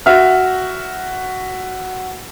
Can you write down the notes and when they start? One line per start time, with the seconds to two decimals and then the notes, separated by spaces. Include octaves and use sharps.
0.06 F#4 E5 F6